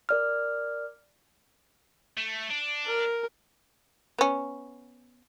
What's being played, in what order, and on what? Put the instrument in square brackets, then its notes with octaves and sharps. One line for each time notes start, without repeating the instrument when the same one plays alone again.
[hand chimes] A#4 D5 F6
[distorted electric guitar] A3
D4
[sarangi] A#4
[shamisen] B3 C#4